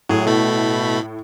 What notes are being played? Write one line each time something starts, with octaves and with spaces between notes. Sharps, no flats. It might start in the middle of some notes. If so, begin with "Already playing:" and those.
A2 F#3 G#4
B2 A3 B5